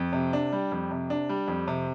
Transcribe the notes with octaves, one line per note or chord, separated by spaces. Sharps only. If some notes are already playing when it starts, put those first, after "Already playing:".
Already playing: F2
C3
D4
G3
F2
C3
D4
G3
F2
C3